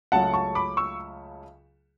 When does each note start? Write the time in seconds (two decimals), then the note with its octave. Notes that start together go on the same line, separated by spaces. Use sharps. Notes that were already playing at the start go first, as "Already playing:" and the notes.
0.12 C#2 C#3 F#3 A3 C#4 F#5 A5
0.33 A5 C#6
0.55 B5 D6
0.77 C#6 E6